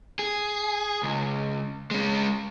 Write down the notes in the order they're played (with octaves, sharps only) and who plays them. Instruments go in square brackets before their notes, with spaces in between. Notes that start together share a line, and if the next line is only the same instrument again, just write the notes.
[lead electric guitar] G#4
C#2
G#3 C#4